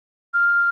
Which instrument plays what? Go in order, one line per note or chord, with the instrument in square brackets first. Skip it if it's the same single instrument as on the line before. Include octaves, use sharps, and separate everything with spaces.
[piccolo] F6